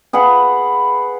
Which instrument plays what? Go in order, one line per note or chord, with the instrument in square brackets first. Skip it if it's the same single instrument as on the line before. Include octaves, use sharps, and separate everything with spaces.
[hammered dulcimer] G#4 B4 F5 F#5